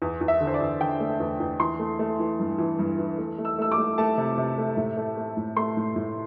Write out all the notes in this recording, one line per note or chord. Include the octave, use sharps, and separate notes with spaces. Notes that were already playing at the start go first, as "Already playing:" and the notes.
E2
E2
E5
D3
C5
D5
E2
D3 G5
A3
E2
E2
E3 C6
A3
A3
E3
G2
E3
G2
E3
A3
A3
E6
A3 E6
D6
A3
A3 A5
C3
C3
A3
A2
A3
A3
A2
A3 C6
A2
A2